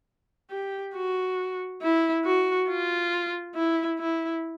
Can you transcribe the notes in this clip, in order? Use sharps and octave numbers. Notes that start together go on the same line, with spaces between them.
G4
F#4
E4
F#4
F4
E4
E4